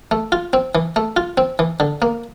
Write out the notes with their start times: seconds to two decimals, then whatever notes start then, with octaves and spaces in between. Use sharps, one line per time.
0.11 A3
0.32 F4
0.53 C4
0.75 E3
0.96 A3
1.17 F4
1.37 C4
1.59 E3
1.80 D3
2.02 A#3